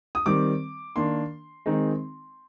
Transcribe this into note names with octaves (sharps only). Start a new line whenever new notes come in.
D#6
D#3 G3 C4 D6
D#3 A#3 D4 C6
D#3 G#3 C4 D#4